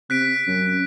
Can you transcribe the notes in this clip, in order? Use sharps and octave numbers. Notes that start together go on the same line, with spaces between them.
C3 F#6 B6 D7
F#2